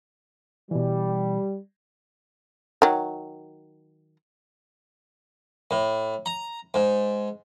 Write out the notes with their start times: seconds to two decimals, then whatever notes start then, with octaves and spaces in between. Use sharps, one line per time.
0.71 B2 E3 G3
2.82 D#3 F#3
5.71 A2
6.26 A#5
6.74 G#2